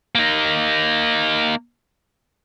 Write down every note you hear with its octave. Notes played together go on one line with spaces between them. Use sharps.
A#3 D#4